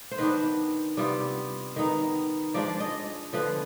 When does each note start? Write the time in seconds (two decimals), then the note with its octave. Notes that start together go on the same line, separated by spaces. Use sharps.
0.11 C5
0.18 D#3 B3 D4 B4
0.97 C3 G3 B3 F4
1.76 D#3 B3 D#4
2.54 F3 G#3 D4 D5
2.80 D#5
3.33 D3 F3 B3 B4